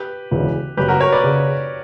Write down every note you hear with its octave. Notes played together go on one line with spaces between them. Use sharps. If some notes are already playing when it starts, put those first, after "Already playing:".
Already playing: G4 B4
E1 D2 C#3 E3
G1 F#2 C#3 G4 B4
F#4 A#4
A#4 C#5
B4 D5
C#3